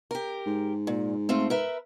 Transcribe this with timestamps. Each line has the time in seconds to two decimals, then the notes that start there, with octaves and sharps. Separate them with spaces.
0.11 G4 A#4
0.46 G#2
0.87 A#2
1.29 A3 C4 F4
1.50 A#4 B4 E5